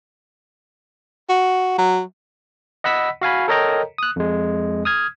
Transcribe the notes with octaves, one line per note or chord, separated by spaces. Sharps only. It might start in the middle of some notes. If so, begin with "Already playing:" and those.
F#4
F#3
D#5 F#5 B5 E6 B6
F#4 F5 G#5 B5
A4 A#4 C#5 D#5 G5 A#5
D#6 F#6
F2 G#3
D#6 F6 G#6